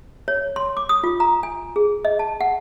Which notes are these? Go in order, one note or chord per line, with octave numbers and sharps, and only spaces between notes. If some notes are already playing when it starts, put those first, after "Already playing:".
C#5
C6
D6
D#6
F4
A#5
G#5
G#4
D#5
A5
F#5